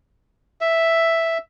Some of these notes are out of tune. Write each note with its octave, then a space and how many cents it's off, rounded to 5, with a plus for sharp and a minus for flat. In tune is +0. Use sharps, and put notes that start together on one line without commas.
E5 +0